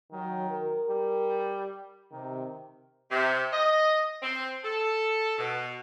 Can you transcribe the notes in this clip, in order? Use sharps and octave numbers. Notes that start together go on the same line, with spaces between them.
D#3 F#3
A#4
G3
C3 D#3
C3
D#5
C4
A4
B2